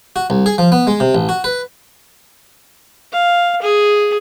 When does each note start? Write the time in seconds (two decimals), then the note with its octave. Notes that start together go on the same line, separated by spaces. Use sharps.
0.16 F#4
0.30 C2
0.46 G#4
0.58 F3
0.72 B3
0.87 G#3
1.00 C3
1.15 A1
1.29 F#4
1.44 B4
3.12 F5
3.62 G#4